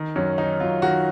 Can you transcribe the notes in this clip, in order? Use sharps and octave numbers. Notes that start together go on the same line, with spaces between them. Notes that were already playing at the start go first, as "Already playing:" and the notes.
Already playing: D#3
F#2 C#4
D#3 D#4
F#2 F4
D#3 F#4